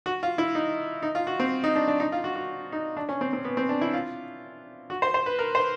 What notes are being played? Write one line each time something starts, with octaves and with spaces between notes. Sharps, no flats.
F#4
F4
E4
D#4
D#4
F4
F#4
C4
D#4
D4
D4
D#4
F4
F#4
F#4
D#4
D4
C#4
C4
C4
B3
C4
D4
E4
F4
F#4
C5
C5
B4
A#4
C5